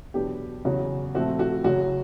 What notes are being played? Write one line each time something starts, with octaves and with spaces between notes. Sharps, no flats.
E2 B2 F#3 B3 D4 G4
E2 C#3 F#3 F#4
A#2 F3 A3 C4 F#4
F#4
F#2 C#3 F#3 F#4